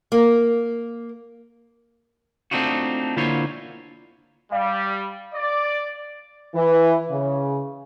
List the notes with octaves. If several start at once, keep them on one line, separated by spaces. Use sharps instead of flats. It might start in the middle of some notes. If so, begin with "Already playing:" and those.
A#3
A3 C4 D4 D#4 F4 F#4
D3 A#3 E4 F4 C5 C#5
G3 F5
D5
E3
C#3